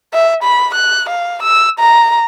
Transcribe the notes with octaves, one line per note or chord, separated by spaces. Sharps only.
E5
B5
F#6
F5
E6
A#5